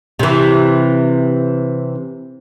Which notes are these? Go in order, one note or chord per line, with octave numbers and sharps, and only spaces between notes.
C3 E3